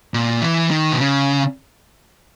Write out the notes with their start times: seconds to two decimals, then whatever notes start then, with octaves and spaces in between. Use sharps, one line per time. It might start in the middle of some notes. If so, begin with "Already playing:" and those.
0.14 A#2
0.42 E3
0.71 D#3
0.92 B2
1.00 C#3